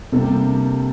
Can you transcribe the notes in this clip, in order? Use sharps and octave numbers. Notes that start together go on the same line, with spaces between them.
C3 G3 A#3 D4 A4